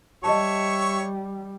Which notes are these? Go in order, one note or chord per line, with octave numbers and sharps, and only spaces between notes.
G3 C#5 D#5 E5 A5 C#6